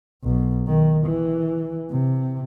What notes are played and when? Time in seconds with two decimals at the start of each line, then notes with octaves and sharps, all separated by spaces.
0.23 B1
0.67 D#3
1.06 E3
1.90 C3